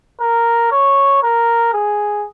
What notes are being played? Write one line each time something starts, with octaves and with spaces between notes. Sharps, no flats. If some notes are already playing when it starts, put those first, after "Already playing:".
A#4
C#5
A#4
G#4